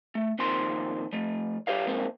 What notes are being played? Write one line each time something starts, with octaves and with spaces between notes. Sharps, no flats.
A3
F2 A#2 D#3 C4 C6
F3 A3
G4 B4 C#5 F5
F2 G#2 A#3 C4